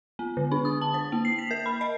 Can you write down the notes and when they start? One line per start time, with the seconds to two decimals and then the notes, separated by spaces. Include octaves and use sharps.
0.19 B3
0.37 D3
0.52 D4
0.65 D#6
0.81 A5
0.94 C5
1.12 A#3
1.25 C7
1.39 B6
1.51 A#4
1.66 B5
1.81 D#5